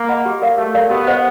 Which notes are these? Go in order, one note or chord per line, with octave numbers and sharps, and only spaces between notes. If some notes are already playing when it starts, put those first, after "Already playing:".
Already playing: A#3
D#5 F#5 B5
G4
A#4 D5 F5
A3 G4
A#4 D5 F5
B3 G4
C5 D#5 F#5